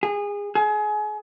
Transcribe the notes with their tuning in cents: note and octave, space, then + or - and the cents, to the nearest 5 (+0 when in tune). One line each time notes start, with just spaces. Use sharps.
G#4 -25
G#4 +30